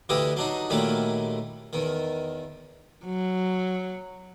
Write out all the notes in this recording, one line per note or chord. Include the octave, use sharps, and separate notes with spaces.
D2 D3 E3 E4 G4 D#5
F#3 D4 D#4
A#2 D#3 F#3 G3 A3 E4
E2 D#3
F#3